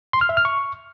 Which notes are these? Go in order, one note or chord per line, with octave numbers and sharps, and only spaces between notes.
C6
F6
E5
F6
C#6